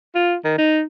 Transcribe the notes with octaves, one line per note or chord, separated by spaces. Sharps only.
F4
D#3
D#4